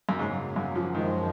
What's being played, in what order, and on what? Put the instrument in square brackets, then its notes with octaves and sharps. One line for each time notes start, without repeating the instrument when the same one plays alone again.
[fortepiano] F#2
[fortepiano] G#2 [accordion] C#3 F#3 A#3
[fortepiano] F#2
F3
[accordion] F#2 F3 G#3 [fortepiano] D#3